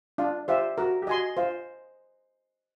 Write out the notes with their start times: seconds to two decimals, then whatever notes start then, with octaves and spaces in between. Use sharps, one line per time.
0.18 D4 F4
0.48 F4 G4 C5 E5
0.78 F#4 A#4
1.02 G4
1.07 F#4 D#5 G#5 C6
1.37 F4 C5